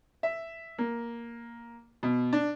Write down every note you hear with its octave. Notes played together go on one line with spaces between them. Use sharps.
E5
A#3
B2
D4